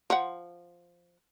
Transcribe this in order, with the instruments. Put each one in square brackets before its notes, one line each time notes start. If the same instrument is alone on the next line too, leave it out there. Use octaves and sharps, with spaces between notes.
[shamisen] F3 F#5